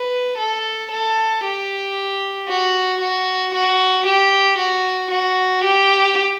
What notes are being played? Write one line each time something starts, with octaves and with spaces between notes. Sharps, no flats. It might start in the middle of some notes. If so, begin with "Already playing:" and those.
Already playing: B4
A4
A4
G4
F#4
F#4
F#4
G4
F#4
F#4
G4